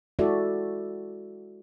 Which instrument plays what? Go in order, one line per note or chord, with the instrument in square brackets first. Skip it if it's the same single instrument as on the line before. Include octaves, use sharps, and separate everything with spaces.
[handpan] G#3 E4 F#4 A4 D5 E5